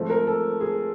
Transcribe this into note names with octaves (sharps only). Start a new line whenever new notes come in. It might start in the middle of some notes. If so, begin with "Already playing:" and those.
Already playing: G#2 F3 A3 C4
A#4
A4
G#4